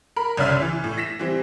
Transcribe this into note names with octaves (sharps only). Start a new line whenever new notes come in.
A#4 B5
G1 C2 C#4 D5 E5 F6
E3
A2
A#6 B6 E7
E3 G3 C4